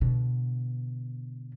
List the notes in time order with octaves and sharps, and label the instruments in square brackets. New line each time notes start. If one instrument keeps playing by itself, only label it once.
[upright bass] B2 D3